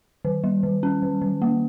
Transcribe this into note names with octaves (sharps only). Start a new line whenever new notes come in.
D#3
G3
D#3
C#4
D#3
D#3
A#3